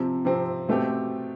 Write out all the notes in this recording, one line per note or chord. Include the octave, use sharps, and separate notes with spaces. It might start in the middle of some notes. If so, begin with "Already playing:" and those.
Already playing: C3 F3 C4
C3 F3 C4
B2 A3 C4 G4